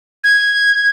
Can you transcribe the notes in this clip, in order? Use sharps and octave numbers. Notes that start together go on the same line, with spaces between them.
G#6